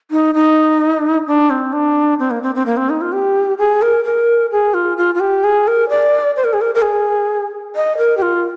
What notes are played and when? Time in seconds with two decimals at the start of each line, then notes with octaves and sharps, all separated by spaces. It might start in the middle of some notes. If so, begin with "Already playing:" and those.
0.11 D#4
0.35 D#4
1.27 D4
1.50 C4
1.73 D4
2.19 C4
2.31 A#3
2.43 C4
2.55 C4
2.66 A#3
2.77 C4
2.90 D#4
3.01 F4
3.12 G4
3.58 G#4
3.82 A#4
4.04 A#4
4.52 G#4
4.74 F4
4.97 F4
5.15 F4
5.20 G4
5.44 G#4
5.67 A#4
5.89 D5
6.37 C5
6.44 A#4
6.53 G#4
6.61 A#4
6.75 A#4
6.82 G#4
7.76 D#5
7.98 A#4
8.17 G4
8.22 F4